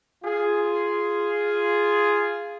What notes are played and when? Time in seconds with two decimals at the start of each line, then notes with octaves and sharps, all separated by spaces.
0.23 F4 G#4